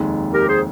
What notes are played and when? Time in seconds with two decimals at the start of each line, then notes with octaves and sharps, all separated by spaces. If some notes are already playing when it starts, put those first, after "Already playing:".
Already playing: F1 D#2 D#3 G#3
0.33 G4 A#4
0.49 G#4 C5